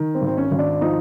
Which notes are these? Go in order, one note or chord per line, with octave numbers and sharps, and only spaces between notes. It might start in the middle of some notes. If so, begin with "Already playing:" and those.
Already playing: D#3
C4
G#1
C4
C#4
G#1
D4
F3 D#4